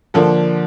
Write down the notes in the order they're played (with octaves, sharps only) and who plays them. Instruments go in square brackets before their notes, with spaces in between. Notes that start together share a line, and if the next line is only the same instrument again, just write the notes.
[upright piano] D3 F3 A#3 D4 A4